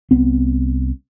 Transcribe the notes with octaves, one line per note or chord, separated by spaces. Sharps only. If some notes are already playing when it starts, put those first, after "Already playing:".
C2 B3 C4